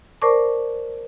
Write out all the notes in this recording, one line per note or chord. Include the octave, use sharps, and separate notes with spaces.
A#4 C5 D5 A5 C#6 D6